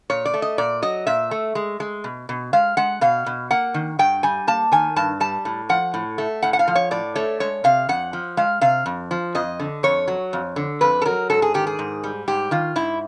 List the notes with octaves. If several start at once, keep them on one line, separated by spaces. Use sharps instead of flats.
A#2 C#5
D5
A3
D#5
A#2 D5
F#3 D#5
A#2 E5
A3
G#3
G#3
B2
B2
G#3 F5
G#3 F#5
B2 F5
B2
A#3 F#5
D#3
G2 G5
G3 G#5
A#3 A5
D#3 G#5
G2 A5
G3 A5
A2
F3 F#5
A2
A3
A2 F#5
F#5
F5
F3
C#5
A2 D5
A3 C#5
G#3 C#5
C3 F5
F2 F#5
F3
G#3 F5
C3 F5
F2
F3
F2 D#5
D3
F2 C#5
F#3
F2
D3
F2 B4
A4
F#3 A#4
G#2 A4
G#4
D#3 G4
G#4
G#2
G3
G#2 G4
D#3 F4
G#2 E4